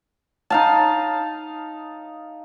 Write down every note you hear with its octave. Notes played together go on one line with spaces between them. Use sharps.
D#4 F5 A5